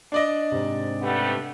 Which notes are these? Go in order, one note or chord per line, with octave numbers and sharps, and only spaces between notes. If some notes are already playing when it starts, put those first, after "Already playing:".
D4 D5 D#5
G#2 C3
G3 A3 B3